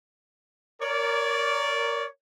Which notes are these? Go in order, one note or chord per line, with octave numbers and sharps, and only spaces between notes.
A#4 C#5 D5